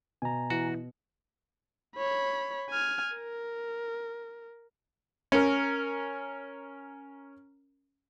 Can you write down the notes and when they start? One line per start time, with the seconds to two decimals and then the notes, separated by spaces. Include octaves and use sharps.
0.22 B2 G#5 A#5
0.50 E3 F#4
1.96 C#5 B5
2.70 G#5 F6
3.15 A#4
5.32 C#4 A#4